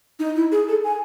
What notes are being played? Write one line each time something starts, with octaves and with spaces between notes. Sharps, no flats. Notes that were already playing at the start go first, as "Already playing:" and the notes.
D#4
E4
G#4
A4
G#5